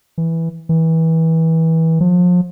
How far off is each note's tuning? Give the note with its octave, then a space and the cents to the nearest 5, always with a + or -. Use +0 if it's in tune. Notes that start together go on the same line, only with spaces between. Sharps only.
E3 -5
E3 -25
F3 +35